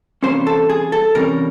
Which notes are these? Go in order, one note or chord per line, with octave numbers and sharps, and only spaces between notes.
C3 E3 G3 A#3 C#4 C5
A4
G#4
A4
C3 E3 G3 A#3 C#4 A#4